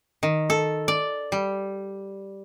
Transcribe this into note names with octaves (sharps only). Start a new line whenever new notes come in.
D#3
A4
D5
G3